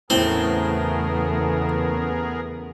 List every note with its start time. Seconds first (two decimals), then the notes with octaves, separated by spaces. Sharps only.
0.10 E2 A2 C#3 A3 B3 C4 G#4 A#4